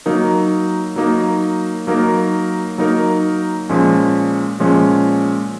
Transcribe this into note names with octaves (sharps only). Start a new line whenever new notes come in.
F#3 A#3 D#4 A#4
F#3 A#3 D#4 A#4
F#3 A#3 D#4 A#4
F#3 A#3 D#4 A#4
A#2 F3 G#3 C#4
A#2 F3 G#3 C#4